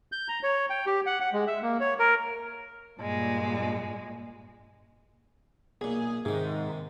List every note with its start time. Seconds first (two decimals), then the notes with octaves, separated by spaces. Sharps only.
0.12 G6
0.28 A#5
0.43 C#5
0.70 G5
0.86 G4
1.06 F#5
1.21 F#5
1.33 G#3
1.47 E5
1.62 A#3
1.80 C#5
1.99 A#4
3.00 G2 A#2 G#3
5.81 B1 A#2 G#4
6.25 G#2 C3 D#3